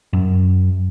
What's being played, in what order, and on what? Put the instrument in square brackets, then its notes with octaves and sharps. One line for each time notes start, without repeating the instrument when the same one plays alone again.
[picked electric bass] F#2